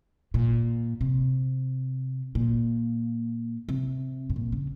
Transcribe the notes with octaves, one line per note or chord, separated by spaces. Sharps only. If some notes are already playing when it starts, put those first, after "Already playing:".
A#2
C3
A#2
C3
G#2
A#2
C#3